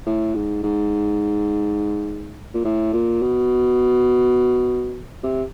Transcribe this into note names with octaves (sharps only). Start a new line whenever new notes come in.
A2
G#2
G#2
A#2
A2
A#2
B2
C3